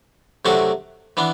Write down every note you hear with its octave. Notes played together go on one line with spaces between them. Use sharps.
C3 F#3 A3 D4 F#4
E3 B3 D4